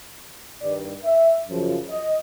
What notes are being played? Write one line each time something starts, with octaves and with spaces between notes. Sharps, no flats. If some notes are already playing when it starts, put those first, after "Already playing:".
G2 D#3 D5
E5
F#2 C#3 F3
D#5